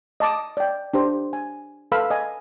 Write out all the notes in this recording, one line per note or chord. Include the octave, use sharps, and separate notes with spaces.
D#5 A5 D6 D#6
D5 G5
D4 G4 C5
G#5
A4 B4 F5 B5 E6
D#5 G#5